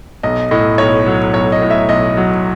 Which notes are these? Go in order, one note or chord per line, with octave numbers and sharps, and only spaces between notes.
B1 D#5
A2 D#5
B1 C#5
F#3
B1 C#5
D#5
A2
E5
B1 D#5
F#3